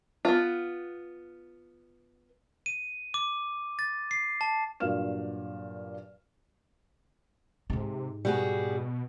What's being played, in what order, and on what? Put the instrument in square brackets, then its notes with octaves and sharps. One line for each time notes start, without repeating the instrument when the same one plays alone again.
[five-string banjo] B3 F4
[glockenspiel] D#7
D6
A6
C7
A5
[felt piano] G2 A#2 F#3 F5 F6 E7
[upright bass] G#2 D#4 [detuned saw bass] C3
[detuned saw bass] B2 [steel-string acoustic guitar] G3 F#4 G#4